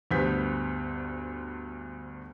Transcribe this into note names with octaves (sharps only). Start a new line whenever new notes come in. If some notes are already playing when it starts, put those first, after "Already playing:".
D2 G2 B3 C5 G6 B6